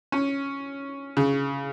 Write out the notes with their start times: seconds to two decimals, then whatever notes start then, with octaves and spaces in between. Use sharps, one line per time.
0.12 C#4
1.17 C#3